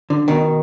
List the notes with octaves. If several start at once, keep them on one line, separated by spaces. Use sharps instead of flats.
D3
B2 D#3